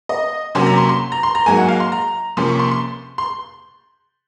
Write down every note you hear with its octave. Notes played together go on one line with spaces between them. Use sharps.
D#5
C3 F#3 A#3 C#4 C6
A#5
C6
C6
A#5
C6
A#5
G#2 F#3 A#3 G#5
F#5
F5
C6
A#5
C3 F3 A#3 C#4 C6
C#6
C6
C6
C6